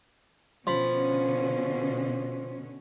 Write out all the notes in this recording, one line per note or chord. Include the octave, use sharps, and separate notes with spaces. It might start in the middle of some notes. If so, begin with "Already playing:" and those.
B2 D3 F3 C#4 B5